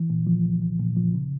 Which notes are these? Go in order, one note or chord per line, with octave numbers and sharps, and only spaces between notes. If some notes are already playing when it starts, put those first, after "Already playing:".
Already playing: E3
A#2
F3
C2
C2
A#2
F3
C#3